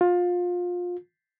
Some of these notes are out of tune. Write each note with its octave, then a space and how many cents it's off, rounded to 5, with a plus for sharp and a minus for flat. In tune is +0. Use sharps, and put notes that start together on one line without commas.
F4 +25